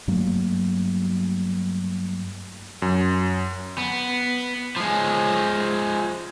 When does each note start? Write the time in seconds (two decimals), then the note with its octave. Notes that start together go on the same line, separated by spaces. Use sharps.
0.08 G2 F#3 A3 A#3
2.82 F#2
3.78 B3
4.77 F3 G#3